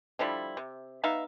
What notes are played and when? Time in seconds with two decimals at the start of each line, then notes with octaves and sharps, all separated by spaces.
0.19 D3 F3 G3 E4
0.57 C3
1.03 B3 D#4 E5 F5